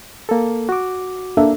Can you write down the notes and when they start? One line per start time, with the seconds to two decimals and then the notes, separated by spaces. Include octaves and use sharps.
0.29 A#3 A4
0.69 F#4 D6
1.37 A#3 D4 A4 E5